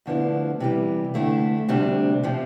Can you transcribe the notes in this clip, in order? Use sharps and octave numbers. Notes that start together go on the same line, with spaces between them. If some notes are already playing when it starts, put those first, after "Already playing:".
D2 D3 F3 B3 E4
C3 E3 G3
F2 D3 A3 E4
D2 C3 G3 D4
C3 F3